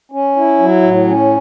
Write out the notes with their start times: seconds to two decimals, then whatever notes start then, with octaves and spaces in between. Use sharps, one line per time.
0.12 C#4
0.36 E4
0.59 F#3
0.82 A2
1.06 C#4